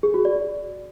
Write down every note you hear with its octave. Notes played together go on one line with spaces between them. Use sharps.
G#4
F#4
D5